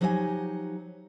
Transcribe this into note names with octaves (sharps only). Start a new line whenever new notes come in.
F3 F#3 D#4 G4 D#5 G#5